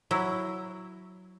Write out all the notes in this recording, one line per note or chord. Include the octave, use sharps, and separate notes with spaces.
F#3 E4